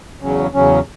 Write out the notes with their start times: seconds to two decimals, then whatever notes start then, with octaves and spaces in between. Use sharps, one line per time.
0.22 E2 C#3 F#3 C#4
0.54 E2 C#3 F#3 C#4